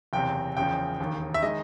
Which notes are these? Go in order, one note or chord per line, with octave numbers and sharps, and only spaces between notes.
F#1 E2 C3 G5
F#1 E2 C#3 F3 G5
E1 D#2 D#3
E5
D#3 G#3 D#5